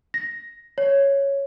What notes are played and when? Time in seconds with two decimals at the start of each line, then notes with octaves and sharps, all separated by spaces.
0.14 A#6
0.78 C#5